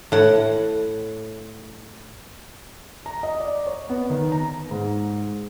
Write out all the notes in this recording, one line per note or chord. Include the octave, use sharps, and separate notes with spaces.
A2 F#5
A#5
D#5
D5
C#5
B3
D#3
A#5
G#2